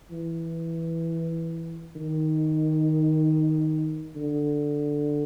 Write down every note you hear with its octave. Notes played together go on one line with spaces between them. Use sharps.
E3
D#3
D3